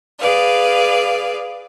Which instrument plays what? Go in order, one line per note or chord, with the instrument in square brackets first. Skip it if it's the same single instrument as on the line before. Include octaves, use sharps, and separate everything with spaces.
[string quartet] G#4 B4 D5 F5